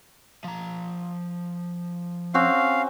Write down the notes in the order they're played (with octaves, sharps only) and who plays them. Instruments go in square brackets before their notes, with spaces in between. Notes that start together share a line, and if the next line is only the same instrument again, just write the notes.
[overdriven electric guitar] F3 A#5
[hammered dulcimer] C4 C#4 F#4 [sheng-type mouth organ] F5